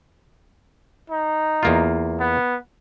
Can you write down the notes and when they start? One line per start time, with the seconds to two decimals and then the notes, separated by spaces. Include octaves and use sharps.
1.10 D#4
1.63 E2 A#3 F4
2.20 B3